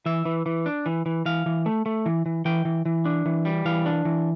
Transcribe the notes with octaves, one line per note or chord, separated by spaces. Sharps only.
E3 E5
E3
E3
D4
E3
E3
E3 F5
E3
A3
A3
E3
E3
E3 G5
E3
E3
D4
E3
G3
E3 F5
D4
E3